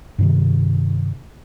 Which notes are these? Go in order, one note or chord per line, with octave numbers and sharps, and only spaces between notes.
G2 C3 D#3